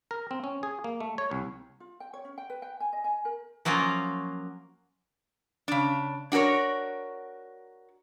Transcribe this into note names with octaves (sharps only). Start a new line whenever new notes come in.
A#4
C4
C#4
G#4
A#3
A3
C#5
C2
F4
G5
C#5
C#4
G5
B4
G5
G#5
D#5
G#5
A#4
F3 F#3 A#3 C#4 F4
C#3 D4
D4 F#4 G#4 A#4 C#5